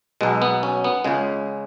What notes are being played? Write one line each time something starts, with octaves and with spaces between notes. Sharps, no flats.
B1 B2 G#3
B3
C#4
B3
C#2 C#3 G#3